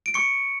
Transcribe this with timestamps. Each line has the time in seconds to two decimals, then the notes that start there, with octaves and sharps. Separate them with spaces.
0.06 D7
0.14 C#6 C#7